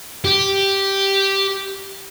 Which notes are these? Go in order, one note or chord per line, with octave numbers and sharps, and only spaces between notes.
G4